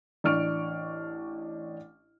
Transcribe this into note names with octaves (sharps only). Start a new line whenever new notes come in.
A1 D4 C#6 F6 D7